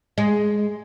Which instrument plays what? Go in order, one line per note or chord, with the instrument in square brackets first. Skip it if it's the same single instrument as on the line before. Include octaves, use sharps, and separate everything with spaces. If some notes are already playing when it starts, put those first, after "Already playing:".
[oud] G#3